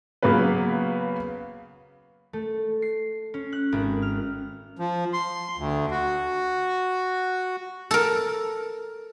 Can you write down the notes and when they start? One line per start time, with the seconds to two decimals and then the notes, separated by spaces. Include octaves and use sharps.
0.22 C#3 F#3 A#3 B3 B4
2.33 A3
2.82 C7
3.34 C#4
3.53 F#6
3.72 G#1
4.02 F6
4.79 F3
5.13 C6
5.57 D2
5.91 F#4
7.91 A4 A#4